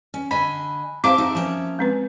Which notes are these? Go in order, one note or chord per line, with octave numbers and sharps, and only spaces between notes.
C#4
D3 D#5 G#5 B5
C4 G4 C5 E5 F5 A5 D6
D#4 F#4 A4
F3 A#3 C#4
G#3 C4 B4